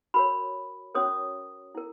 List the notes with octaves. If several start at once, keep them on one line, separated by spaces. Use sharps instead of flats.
F#4 A#4 C#5 B5
C#4 F#4 A#4 C#5 D#6
E4 A#4